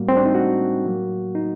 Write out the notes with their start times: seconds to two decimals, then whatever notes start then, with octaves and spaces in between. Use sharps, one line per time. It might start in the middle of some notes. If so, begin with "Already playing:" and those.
Already playing: A2 G3 A#3 F#4
0.09 C4
0.17 D4
0.25 D#4
0.34 F#4
0.84 A2 F#3 A#3
1.35 D#4